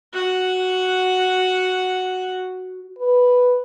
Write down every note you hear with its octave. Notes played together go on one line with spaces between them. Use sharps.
F#4 F#5
B4